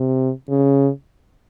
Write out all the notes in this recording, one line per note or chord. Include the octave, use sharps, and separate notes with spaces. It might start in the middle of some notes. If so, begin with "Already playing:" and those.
Already playing: C3
C#3